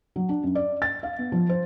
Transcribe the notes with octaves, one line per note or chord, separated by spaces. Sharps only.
F#3
D4
F#2
D5
A6
F5
B3
F3
C5